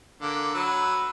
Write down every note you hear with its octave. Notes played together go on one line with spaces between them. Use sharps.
D3 A#3
F#3 B4 E6